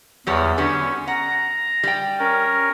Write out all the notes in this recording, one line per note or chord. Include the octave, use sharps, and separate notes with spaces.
E2 F#3 G3 C#5
D3 G3 B3 C#4
F#5 A#5
G3 G5
C#4 A#4